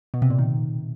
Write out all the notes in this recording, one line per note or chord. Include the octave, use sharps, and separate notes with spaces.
B2
C3
A#2
D#3